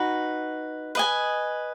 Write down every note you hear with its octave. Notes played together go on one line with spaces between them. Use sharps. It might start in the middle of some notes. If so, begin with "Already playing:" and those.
Already playing: D#4 F#4 B4
B4 D#5 G#5